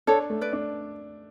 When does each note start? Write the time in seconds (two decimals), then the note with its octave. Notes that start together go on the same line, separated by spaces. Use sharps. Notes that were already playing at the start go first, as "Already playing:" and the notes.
0.07 D4 A4 C#5
0.30 A3
0.41 B4 D5
0.53 D4